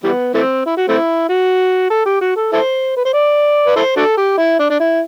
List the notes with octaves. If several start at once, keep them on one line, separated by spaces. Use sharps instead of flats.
E3 G3 B3
E3 A3 C4
E4
F#4
A3 C4 E4
F#4
A4
G4
F#4
A4
E4 A4 C5
B4
C5
D5
B4
E4 A4 C5
D4 F#4 A4
G4
E4
D4
D4
E4